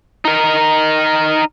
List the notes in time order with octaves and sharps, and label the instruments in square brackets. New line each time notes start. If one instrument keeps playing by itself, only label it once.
[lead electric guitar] D#4 A#4